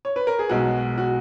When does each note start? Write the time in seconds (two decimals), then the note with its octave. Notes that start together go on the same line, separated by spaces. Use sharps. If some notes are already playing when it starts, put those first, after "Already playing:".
0.05 C#5
0.16 B4
0.27 A#4
0.39 G#4
0.49 B1 B2 G#3 F#4
0.98 F#4